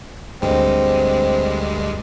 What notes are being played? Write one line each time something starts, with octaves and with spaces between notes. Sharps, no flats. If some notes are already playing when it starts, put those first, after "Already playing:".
D2 G2 G#3 C4